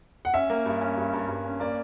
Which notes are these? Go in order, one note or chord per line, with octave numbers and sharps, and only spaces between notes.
F#5
C#4 E5
A#3
G2
C#4
G2
G2
G2
C#4
A#3 D5